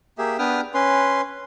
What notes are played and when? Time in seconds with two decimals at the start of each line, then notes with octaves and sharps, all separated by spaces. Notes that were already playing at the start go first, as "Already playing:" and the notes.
0.18 A#3 G4 G#4 E5
0.39 B3 D4 B4 G5 D#6 F6
0.74 C#4 B4 C6